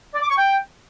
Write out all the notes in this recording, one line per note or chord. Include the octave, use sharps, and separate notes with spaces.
D5
D6
C#6
G5